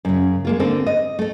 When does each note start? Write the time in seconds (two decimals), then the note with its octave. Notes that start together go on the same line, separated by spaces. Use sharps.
0.05 F#2 C#3
0.45 G#3 A#3 F4
0.60 D3 A#3 C4 A4
0.86 D#5
1.19 A3 A4